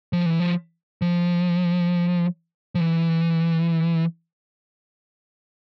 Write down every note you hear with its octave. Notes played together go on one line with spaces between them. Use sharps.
F3
E3
F3
F3
F3
E3